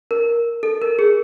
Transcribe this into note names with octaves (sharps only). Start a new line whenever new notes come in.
A#4
A4
A#4
G#4